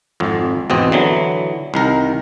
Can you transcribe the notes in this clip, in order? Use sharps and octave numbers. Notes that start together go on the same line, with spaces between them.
G#1 F2
G#1 E2 B2 C4 D#5
D3 E3 F#3
C2 D#3 A#4